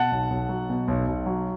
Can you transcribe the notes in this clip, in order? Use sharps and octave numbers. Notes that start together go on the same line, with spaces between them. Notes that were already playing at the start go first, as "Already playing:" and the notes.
Already playing: B2 F#5 A5
B1
B1
F#3
B2
B1
B1
F#3